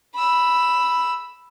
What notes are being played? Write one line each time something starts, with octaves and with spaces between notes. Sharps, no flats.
B5 E6